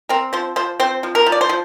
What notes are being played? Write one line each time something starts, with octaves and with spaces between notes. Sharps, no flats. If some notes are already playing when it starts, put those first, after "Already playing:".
C4 A#4
F3 C5
F3 C5
C4 C5
F3
A#4
F3
D5
C5
F3